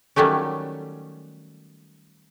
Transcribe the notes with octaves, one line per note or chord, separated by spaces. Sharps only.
D#3 F#3 G3 A3 C#4